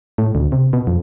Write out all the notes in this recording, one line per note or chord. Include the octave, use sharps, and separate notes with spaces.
A2
D2
C3
B2
F2